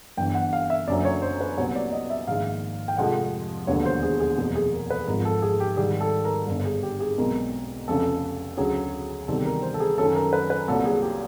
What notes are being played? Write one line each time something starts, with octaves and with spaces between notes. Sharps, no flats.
G1 G2 E3 G5
F#5
F5
E5
F#1 F#2 D3 F#3 D5
C#5
C5
B4
C2 A#2 F#3 B3 C#5
D5
D#5
E5
A#1 G#2 D#3 G#3 F5
G5
F1 F2 C3 F3 G#3 F#5
E1 D#2 D3 F#3 B3 C#5
C5
G#4
G#4
F1 E2 B2 F#3 A#3 G#4
G#4
A#4
B4
G#1 G#2 F3 A#4
A4
G#4
G4
G#2 D#3 G3 G#4
A4
A#4
G1 G2 D3
G#4
G4
G#4
B1 B2 G#3 C4 A#4
F1 F2 C#3 A4
D2 C#3 F#3 G#4
E2 C3 D#3 G3 C4 A4
A#4
C5
A4
G#4
F#2 D#3 F#3 A3 C#4 A4
A#4
B4
B4
C2 A#2 F#3 A4
G#4
G4